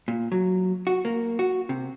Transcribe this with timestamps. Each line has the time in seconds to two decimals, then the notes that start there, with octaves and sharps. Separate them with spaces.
0.08 A#2
0.32 F#3
0.87 F#4
1.05 A#3
1.39 F#4
1.69 C3